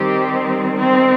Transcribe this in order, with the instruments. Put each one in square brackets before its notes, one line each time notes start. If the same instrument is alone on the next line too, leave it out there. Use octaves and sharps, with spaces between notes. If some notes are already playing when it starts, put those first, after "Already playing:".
Already playing: [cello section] D#3 G3 C4 G4
C4